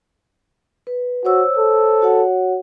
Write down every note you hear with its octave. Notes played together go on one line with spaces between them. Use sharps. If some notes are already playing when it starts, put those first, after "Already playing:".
B4
F#4 C5 C#5 E6
A4
F#4 C#5 F#5